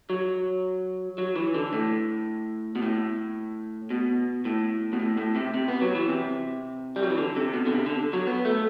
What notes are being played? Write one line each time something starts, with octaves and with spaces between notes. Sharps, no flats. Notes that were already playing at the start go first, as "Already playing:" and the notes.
F#3
F#3
E3
D3
A2
B2
A2
B2
A2
B2
A2
A2
C3
C3
B3
F#3
E3
C3
G3
F#3
E3
D3
C3
B2
D3
C3
D3
F#3
B3
A3